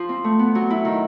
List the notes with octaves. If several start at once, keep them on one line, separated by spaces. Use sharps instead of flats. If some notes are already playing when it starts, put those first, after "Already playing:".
Already playing: F3
C4
A3
B3
F#3
E4
D#3